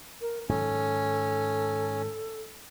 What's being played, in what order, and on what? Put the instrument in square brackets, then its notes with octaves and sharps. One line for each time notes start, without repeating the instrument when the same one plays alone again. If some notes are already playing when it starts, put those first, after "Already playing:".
[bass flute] A#4
[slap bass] G#2 D#3 F#3 [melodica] C#4 [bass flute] A4